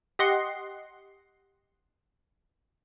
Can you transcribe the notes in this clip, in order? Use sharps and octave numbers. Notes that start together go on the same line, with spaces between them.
G4 D#5 F#5 C6